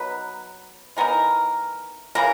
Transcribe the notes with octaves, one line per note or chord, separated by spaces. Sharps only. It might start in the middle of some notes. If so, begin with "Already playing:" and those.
Already playing: F#3 B3 D#4 B4
E3 B3 D#4 A#4
C#3 E3 A#3 A#4